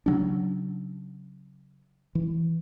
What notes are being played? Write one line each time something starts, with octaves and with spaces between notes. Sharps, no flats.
C#3 F#3 D4
E3